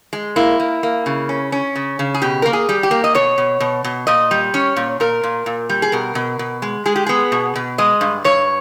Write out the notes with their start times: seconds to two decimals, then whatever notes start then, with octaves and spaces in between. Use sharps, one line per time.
0.13 G#3
0.36 A#3 E4
0.60 A#3
0.83 A#3
1.06 C#3
1.29 C#4
1.52 C#4
1.75 C#3
1.99 C#3
2.14 G#4
2.22 B2 G4
2.42 A#3 A#4
2.53 G#4
2.69 G3
2.83 G4
2.91 A#3
3.04 D#5
3.15 B2 C#5
3.38 B2
3.60 B2
3.84 B2
4.07 A#2 D#5
4.31 G3
4.54 C#4 C#5
4.76 A#2
5.00 A#2 A#4
5.24 A#2
5.46 A#2
5.70 G3
5.82 G#4
5.92 B2 A#4
6.15 B2
6.39 B2
6.62 G#3
6.86 G#3 G#4
6.96 G4
7.06 B3 G#4
7.32 B2
7.56 B2
7.78 G#3 D#5
8.01 G2
8.24 G2 C#5